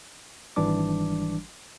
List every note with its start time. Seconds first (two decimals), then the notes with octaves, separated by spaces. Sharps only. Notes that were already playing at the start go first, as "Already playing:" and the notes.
0.56 G#1 E3 G3 D4 D6